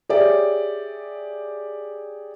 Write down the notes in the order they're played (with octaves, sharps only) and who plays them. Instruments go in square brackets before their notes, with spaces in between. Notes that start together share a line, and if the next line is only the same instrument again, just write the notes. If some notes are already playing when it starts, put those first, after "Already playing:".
[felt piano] G4 G#4 C#5 D5 E5